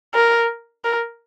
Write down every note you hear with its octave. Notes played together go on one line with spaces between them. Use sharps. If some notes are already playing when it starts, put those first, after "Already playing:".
A#4
A#4